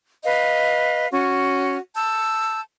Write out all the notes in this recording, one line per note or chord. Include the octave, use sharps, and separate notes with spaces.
B4 D#5 F5
C#4 F#4
A5 E6 G6